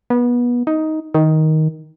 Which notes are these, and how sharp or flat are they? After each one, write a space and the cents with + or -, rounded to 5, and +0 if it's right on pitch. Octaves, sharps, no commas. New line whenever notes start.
B3 -25
D#4 +10
D#3 +10